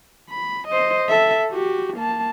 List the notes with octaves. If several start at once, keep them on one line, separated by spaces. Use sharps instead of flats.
B5
C5 D#5
A4 E5
F#4 G4
A#3 A5